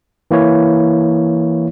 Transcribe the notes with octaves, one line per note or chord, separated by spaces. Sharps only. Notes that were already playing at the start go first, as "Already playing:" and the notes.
E3 A#3 E4 C#5